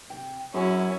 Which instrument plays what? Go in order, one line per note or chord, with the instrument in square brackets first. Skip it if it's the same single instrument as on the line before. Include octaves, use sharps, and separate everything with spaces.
[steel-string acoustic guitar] C3 G5
[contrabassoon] F#2 [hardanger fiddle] C#4 E4 [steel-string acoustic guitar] F#4 G#4